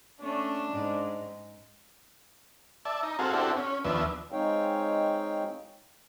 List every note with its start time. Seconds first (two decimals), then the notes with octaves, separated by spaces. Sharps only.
0.21 A3 C#4 D4
0.71 G#2
2.85 D5 E5 A5
3.03 D#4 A#5
3.19 C4 F#4 G#4 A4 F5
3.33 C4 D4 E4 F#4 G4 A4
3.57 C#4
3.84 D#2 F3 B3 D4 E5
4.32 G#3 C4 D#4 C#5 F5 G5